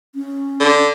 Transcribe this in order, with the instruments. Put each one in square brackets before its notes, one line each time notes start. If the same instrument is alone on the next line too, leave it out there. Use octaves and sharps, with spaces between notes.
[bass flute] C#4
[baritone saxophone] D3